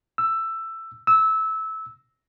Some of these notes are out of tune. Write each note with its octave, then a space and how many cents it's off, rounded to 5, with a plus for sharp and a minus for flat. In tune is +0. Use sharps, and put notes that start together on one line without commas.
E6 +10
E6 -20